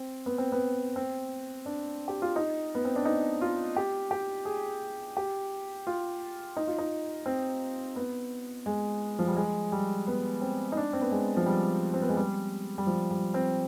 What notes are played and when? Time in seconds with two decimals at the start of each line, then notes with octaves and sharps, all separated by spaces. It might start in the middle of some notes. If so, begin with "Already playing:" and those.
Already playing: C4
0.26 B3
0.38 C4
0.52 B3
0.96 C4
1.66 D4
2.08 G4
2.22 F4
2.36 D#4
2.75 B3
2.85 C4
2.96 D4
3.05 D#4
3.41 F4
3.76 G4
4.11 G4
4.45 G#4
5.17 G4
5.87 F4
6.57 D#4
6.67 F4
6.78 D#4
7.26 C4
7.96 B3
8.66 G#3
9.19 F3
9.27 G3
9.37 G#3
9.72 G3
10.07 B3
10.41 C4
10.72 D#4
10.77 D4
10.93 C4
11.02 B3
11.11 G#3
11.37 F3
11.46 G3
11.94 C4
12.02 B3
12.09 G#3
12.17 G3
12.78 G3
12.87 F3
13.11 G3
13.34 C4